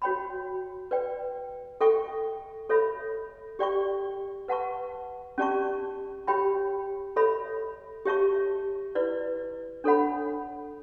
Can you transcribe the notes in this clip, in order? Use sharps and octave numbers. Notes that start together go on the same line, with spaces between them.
F#4 C#5 G5 B5
B4 D5 G5
A4 E5 G5 C#6
A4 C#5 E5 B5
G4 D5 G5 C#6
B4 F#5 A5 C#6
C#4 G4 D5 A5 C#6
G4 C#5 G5 B5
A4 C#5 E5 B5
G4 C#5 E5 A5 C#6
E4 B4 D5
D4 A4 C#5 F#5 B5